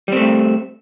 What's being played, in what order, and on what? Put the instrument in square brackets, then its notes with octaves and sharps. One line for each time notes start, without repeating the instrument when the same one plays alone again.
[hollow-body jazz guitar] G3
C4
A3